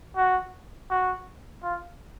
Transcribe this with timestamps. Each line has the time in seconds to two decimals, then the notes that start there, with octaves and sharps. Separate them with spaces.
0.17 F#4
0.90 F#4
1.63 F4